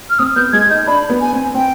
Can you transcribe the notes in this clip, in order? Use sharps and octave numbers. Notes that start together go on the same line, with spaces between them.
F6
C4 D#6
B3 G6
G#3 G#6
D#4 G6
D4 B5
B3
G#5
C4
C4 G5